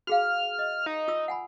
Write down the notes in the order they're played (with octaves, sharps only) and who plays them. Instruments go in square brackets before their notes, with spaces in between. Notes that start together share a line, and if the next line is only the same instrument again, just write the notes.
[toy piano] F#4 G#4 F5 [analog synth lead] F6
[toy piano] D#5
[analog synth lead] D#4
[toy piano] F4 D#6 E6
F#5 G#5 B5